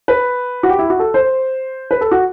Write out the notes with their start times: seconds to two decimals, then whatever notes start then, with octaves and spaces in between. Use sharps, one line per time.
0.08 B4
0.63 F#4
0.69 G4
0.79 E4
0.90 F#4
0.99 A4
1.14 C5
1.91 B4
2.01 A4
2.11 F#4